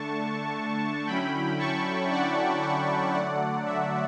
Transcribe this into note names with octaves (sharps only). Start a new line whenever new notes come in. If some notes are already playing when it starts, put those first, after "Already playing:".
Already playing: D3 A3 D4 A5 C#6
D3 F#3 C#4 E4 G5 B5
A5 C#6
D5 F#5
D5 F#5
D3 F#3 A3 D5 F#5
E5